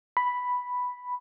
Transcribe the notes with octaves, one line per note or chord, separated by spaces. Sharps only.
B5